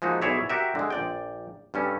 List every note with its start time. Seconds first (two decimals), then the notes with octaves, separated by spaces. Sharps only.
0.02 F3 G#3 A#3 D#4 F#4
0.22 B1 E4 G#4 C#5 D5 E5
0.49 F#4 G4 A#4 E5
0.75 D3 G#3
0.90 A#1 D5 G5
1.74 G2 G3 C#4 A4